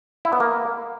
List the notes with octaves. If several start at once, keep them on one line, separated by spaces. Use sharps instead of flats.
E4
B3
A#3